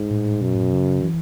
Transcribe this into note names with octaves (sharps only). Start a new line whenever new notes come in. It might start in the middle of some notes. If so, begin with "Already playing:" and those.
Already playing: G#2
A2
F#2 B2
A2
B2
C#3
E3